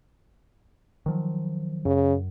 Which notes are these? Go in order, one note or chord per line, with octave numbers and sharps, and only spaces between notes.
D#3 F3 F#3
F#2 C#3